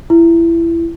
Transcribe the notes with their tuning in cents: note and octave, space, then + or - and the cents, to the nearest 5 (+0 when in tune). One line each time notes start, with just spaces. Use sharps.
E4 +20